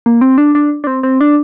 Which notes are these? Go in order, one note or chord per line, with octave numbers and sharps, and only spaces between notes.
A#3
C4
D4
D4
D4
C4
C4
D4